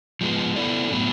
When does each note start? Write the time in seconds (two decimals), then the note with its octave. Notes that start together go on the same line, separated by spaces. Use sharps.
0.21 F3 G#3 B3
0.56 B3 E4 A4 D5
0.91 A2 F#3 B3